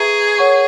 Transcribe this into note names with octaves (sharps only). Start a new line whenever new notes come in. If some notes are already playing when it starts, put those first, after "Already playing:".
Already playing: G#4 B4 E5 A#5 C#6
A#4 C#5 F#5 C#6